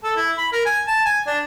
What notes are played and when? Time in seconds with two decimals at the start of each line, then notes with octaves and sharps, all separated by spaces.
0.04 A4
0.16 E4
0.38 B5
0.52 A#4
0.65 G#5
0.87 A5
1.05 G#5
1.27 D4